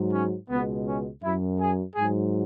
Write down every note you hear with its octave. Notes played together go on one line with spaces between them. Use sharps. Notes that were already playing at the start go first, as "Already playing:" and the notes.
Already playing: G#2 F#3
C#4
C#2 B2 G#3 B3
C#4
F#2 F#3 E4
G#4
G#2 F#3 G#4